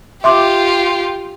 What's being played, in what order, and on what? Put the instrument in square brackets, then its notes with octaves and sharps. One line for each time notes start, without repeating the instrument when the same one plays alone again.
[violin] F4 G4 [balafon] E5 C6 D6